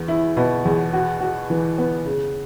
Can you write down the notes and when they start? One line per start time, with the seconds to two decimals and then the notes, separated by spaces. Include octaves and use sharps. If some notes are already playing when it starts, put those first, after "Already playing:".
Already playing: E2
0.08 E4
0.37 B2
0.65 E2
0.93 F#4
1.21 F#4
1.50 E3
1.78 B3
2.06 C#3